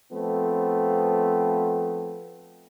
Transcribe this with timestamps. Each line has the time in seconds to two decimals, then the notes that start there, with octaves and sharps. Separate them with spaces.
0.12 F3 A3 B3 C4